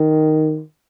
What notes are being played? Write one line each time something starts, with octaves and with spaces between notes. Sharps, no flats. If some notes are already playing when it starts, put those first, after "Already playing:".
Already playing: D#3